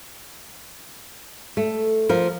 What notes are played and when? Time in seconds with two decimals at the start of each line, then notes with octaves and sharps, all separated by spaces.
1.57 A3
2.09 F3 A#4